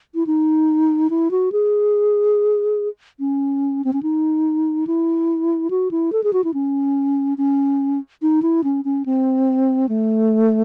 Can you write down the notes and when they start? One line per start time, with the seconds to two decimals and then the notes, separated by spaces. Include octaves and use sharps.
0.15 E4
0.27 D#4
1.10 E4
1.31 F#4
1.52 G#4
3.20 C#4
3.84 C4
3.93 C#4
4.03 D#4
4.87 E4
5.70 F#4
5.91 E4
6.12 A4
6.24 G#4
6.33 F#4
6.44 E4
6.54 C#4
7.38 C#4
8.22 D#4
8.42 E4
8.64 C#4
8.85 C#4
9.06 C4
9.89 A3